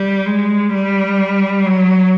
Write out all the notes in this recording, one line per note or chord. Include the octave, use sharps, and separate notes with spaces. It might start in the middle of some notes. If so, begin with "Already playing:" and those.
Already playing: G3
G#3
G3
F#3